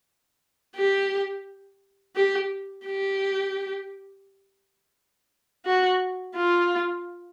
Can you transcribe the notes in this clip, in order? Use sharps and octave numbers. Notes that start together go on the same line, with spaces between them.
G4
G4
G4
F#4
F4